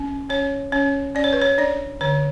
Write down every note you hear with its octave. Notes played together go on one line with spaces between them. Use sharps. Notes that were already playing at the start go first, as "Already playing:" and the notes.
Already playing: C#4
C#4 C#5
C#4 C#5
C#4 D5
C#5
B4
C#5
D4 D5
D3 C#5